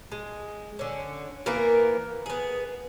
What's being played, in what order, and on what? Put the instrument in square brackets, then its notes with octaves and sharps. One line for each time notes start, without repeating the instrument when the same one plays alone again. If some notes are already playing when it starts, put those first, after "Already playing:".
[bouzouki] G#3
D3 C#4
E3 A#3 B3 A#4
B3 G#4